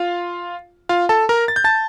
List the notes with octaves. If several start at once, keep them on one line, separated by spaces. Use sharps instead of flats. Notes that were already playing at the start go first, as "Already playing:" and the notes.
Already playing: F4 F5
F4 F5
A4 A5
A#4 A#5
A6
G6
A5 A6